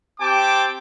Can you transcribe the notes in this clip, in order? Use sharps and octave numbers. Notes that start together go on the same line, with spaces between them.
C4 G4 G5 A5 D6